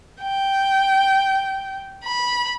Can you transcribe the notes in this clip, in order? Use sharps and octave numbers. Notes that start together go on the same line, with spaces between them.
G5
B5